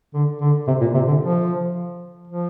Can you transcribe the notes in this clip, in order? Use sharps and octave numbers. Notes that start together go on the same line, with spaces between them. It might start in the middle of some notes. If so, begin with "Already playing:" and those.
D3
D3
C3
A#2
C3
D3
F3
F3